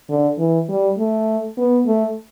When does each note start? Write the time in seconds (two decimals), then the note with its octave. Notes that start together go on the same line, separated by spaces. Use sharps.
0.09 D3
0.38 E3
0.69 G3
0.99 A3
1.58 B3
1.87 A3